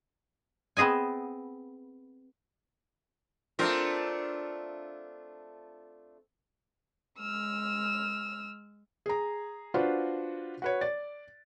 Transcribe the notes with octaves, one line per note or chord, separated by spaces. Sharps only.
B3 C4 G#4 D#5 G#5
A3 C4 D4 F4 A#4
G#3 E6 F6
G#4 A#5
D4 F4 F#4 B4 C5
F#4 B4 C#5
D5 A6